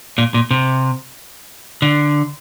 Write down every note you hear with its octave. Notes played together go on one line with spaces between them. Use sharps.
A#2
A#2
C3
D3